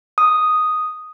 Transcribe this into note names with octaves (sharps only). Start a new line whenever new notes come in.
D#6